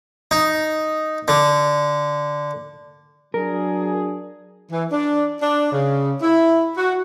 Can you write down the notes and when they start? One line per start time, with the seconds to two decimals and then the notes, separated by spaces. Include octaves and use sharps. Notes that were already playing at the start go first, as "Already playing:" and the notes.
0.31 D#4
1.28 D3
3.34 F#3 D4 G#4 A#4
4.72 E3
4.92 D4
5.42 D4
5.72 C#3
6.22 E4
6.77 F#4